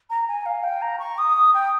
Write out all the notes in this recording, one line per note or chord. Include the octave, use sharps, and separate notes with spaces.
A#5
G#5
F5
G5
A#5
C#6
D#6
G5